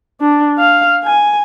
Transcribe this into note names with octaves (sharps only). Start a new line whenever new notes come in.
D4
F5
G#5